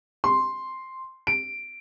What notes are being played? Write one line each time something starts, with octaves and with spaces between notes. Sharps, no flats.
C6
D7